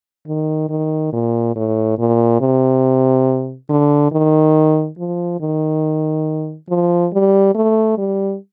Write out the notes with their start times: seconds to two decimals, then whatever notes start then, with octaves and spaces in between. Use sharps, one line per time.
0.27 D#3
0.69 D#3
1.13 A#2
1.55 A2
1.98 A#2
2.41 C3
3.69 D3
4.12 D#3
4.98 F3
5.40 D#3
6.69 F3
7.12 G3
7.55 A3
7.98 G3